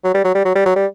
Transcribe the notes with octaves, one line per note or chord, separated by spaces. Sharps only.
F#3
G3
F#3
G3
F#3
G3
F#3
G3